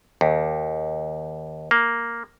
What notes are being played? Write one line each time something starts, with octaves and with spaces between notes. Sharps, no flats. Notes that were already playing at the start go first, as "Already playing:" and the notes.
D#2
A#3